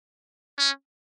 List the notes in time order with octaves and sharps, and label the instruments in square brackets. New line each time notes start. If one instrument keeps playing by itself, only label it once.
[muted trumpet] C#4